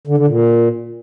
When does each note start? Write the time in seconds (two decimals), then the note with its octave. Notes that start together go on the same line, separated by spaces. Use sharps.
0.07 D3
0.17 D3
0.28 A#2